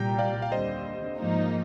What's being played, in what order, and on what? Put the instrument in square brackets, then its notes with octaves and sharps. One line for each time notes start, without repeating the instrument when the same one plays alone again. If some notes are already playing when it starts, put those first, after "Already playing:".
Already playing: [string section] C2 A#2 G3 [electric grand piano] G5 A#5
[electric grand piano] D5 F5
F5
[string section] D#2 D3 G3 C4 [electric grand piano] C5 D#5
[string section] G#2 F3 A#3 D#4